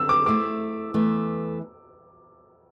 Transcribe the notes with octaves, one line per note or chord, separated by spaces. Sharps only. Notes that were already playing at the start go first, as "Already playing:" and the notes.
Already playing: D3 C4 E6
D6
A3 E4 C5 D6
E2 E3 A3